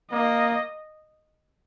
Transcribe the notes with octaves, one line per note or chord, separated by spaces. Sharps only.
A#3 D#5